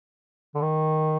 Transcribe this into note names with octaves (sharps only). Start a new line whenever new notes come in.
D3
D#3